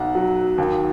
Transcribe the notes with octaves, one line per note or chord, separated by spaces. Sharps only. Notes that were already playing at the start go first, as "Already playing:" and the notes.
Already playing: B1 F#5
F#3
D#2